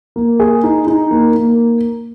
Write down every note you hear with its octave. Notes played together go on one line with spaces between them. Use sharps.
A#3
G#4
D#4
D#4
A#3
A#3